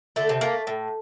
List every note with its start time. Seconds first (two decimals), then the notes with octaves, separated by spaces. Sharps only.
0.16 D3 A3 A4
0.29 C3 C4
0.41 A3 A#3
0.67 A2